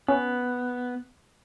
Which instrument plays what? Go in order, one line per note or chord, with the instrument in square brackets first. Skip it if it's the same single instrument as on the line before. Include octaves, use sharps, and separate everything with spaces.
[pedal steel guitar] B3 [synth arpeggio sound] C#4